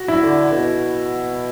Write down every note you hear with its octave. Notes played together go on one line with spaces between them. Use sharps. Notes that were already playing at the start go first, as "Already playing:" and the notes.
Already playing: F#4
E4
D3
B2